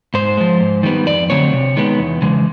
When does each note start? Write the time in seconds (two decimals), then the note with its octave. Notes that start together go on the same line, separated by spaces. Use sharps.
0.14 G#2 C5
0.37 F3 G#3
0.60 G#2
0.83 D#3 G3 B3
1.07 F2 D5
1.30 D3 F#3 A3 C4 C#5
1.53 C3
1.77 D#3 G#3 B3
1.99 E2
2.22 C#3 E3 G#3